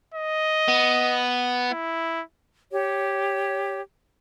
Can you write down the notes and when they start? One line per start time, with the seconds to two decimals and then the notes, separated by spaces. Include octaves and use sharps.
0.14 D#5
0.68 B3
1.71 E4
2.72 G4 C#5